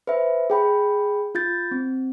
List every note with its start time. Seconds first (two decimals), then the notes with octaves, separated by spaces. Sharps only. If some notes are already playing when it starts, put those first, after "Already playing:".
0.07 B4 C5 E5
0.50 G#4 G5 B5
1.35 F4 G6 A6
1.71 C4